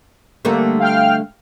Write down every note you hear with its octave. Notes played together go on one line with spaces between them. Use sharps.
D3 G3 A3 A#3
F5 G5 F6